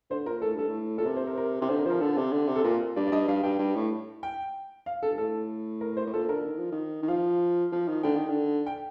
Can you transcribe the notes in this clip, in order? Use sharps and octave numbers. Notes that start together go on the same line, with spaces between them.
D3 C5
A#2 A#4
A2 A4
G2 A4
A2
A#2 A4
C3 A#4
C5
A#4
A#4
C3
D3 C5
A#4
F3 A#4 C5
D3 A4
C3
D3
C3
A4
A#2 A#4
G2 D5
D5
G2 D#5
G2 F5
G2 G5
G2
A2
G5
F5
A4
G2
A2 A4
A#4
C5
A2
A#2 A4
A4
D3 A#4
D#3
F3
D#3
D#3
F3 F5
F3
D#3
D3 G5
D#3
D3
G5